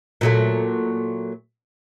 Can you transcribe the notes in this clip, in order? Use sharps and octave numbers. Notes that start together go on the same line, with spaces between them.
A#2 F#3 A3